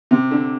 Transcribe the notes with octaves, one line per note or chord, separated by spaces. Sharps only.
C3
D3